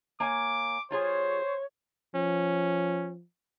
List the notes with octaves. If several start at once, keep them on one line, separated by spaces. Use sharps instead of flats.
A#3 C#5 G#5 D6
G3 F4 G#4 C5 C#5
F3 C#4